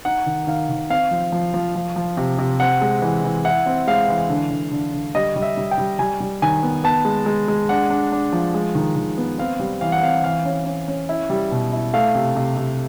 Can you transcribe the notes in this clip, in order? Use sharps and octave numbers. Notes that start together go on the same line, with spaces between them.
D#4 F#5
D#3
D#3 F5
D#3
C4 F5
F3
F3
F3
F3
F3
C3
C3
C4 F#5
G#3
E3
E3
E4 F#5
C4
G#3 F5
E3
D3
D3
D3
D3
G3 D#5
G3
E5
G3
G5
G3
G3 G#5
G3
D#3 G#5
B3
B3 A5
G#3
G#3
G#3
D4 F#5
D4
D4
F3
G#3
D#3
D#3
B3
C4 F5
G3
E3 F5
F#5
C4 F5
E3 F5
C#4
C#4
C#4
E4
G3
B2
E4
A3 F5
C3
C3
C3